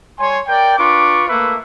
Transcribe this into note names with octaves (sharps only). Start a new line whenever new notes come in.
G3 C#5 G#5 C6
A#4 D5 G5
D4 F4 B4 C#6 D6
A3 A#3 B4 E5